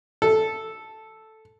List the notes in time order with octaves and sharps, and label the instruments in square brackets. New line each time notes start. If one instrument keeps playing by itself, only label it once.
[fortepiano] A4